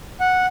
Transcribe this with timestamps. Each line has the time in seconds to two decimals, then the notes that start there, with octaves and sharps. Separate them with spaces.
0.20 F#5